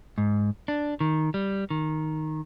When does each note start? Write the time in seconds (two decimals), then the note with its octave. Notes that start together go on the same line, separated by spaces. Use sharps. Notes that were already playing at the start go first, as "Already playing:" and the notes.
0.18 G#2
0.68 D4
1.00 D#3
1.34 G3
1.70 D#3